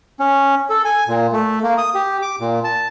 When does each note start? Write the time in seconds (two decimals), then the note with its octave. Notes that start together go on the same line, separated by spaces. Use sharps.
0.20 C#4
0.70 A4
0.85 G#5
1.08 A#2
1.33 A3
1.63 A#3
1.78 D#6
1.95 G4
2.22 D6
2.40 A#2
2.64 A5